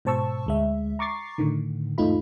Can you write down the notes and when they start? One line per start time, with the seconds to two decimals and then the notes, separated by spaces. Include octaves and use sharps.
0.05 G#2 B2 C5 A5 C#6 E6
0.47 D2 G#3 E5
0.99 A#5 C#6 D6 A6 C7
1.38 A2 D3 D#3
1.98 E2 G#2 A3 D#4 F4 B5